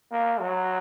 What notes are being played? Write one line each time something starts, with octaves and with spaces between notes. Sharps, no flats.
A#3
F#3